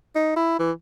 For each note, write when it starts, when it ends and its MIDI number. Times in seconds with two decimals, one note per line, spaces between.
0.16 0.33 63
0.36 0.59 64
0.59 0.72 52